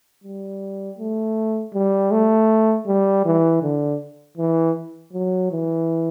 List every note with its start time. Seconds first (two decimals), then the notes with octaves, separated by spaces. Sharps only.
0.24 G3
0.99 A3
1.74 G3
2.11 A3
2.87 G3
3.26 E3
3.63 D3
4.38 E3
5.13 F#3
5.51 E3